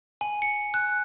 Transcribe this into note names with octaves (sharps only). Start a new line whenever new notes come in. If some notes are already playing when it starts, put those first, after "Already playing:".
G#5
C#7
F#6